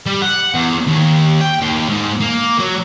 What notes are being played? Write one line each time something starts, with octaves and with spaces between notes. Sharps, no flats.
G3
F#5
E2
D#2
G5
D#2
G#2
A#3
F#3